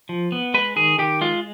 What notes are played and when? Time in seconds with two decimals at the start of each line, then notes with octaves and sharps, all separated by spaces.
0.09 F3
0.32 B3
0.54 G#3 B4
0.76 D#3 G#4
0.98 D#3 G4
1.21 G#3 F4